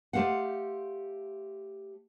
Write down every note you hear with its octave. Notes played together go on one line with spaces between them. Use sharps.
A3 G4 C5 F5 F#5